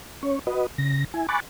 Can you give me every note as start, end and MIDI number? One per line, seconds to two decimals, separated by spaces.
0.23 0.39 61
0.23 0.39 73
0.47 0.66 66
0.47 0.66 71
0.47 0.66 75
0.78 1.05 49
0.78 1.05 94
1.14 1.27 64
1.14 1.27 80
1.29 1.40 80
1.29 1.40 83
1.29 1.40 85
1.29 1.40 86
1.29 1.40 90
1.29 1.40 93